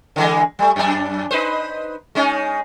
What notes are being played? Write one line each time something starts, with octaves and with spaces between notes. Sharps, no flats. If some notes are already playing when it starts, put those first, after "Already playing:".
D3 E3 G#3
G3 A3
F#2 D4
D#4 B4 C5
G#3 C#4 D#4